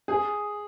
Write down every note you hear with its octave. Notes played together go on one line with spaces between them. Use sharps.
G#4